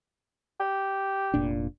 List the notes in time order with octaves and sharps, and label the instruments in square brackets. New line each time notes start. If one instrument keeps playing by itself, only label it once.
[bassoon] G4
[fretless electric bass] F1 A#2 D4